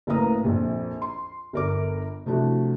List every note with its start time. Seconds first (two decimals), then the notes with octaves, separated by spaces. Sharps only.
0.07 F#1 A2 B4 F5 A#5 D#6
0.44 A#1 F2
1.02 C6
1.53 G1 A#4 D6
2.26 C3 F3 A3 D4 E4 F#4